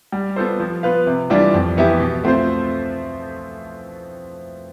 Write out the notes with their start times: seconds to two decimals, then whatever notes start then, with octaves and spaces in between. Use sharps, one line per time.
0.12 G3
0.36 B3 F4 A4 C5
0.60 F3
0.83 B3 F4 B4 F5
1.07 C3
1.30 E3 G3 D4 F4
1.54 F2
1.77 E3 B3 E4 G4
2.00 B2
2.24 A3 C4 F4 C5